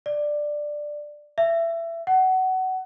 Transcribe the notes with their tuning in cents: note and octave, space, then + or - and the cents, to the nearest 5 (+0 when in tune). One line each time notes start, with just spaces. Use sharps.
D5 +10
E5 +20
F#5 +20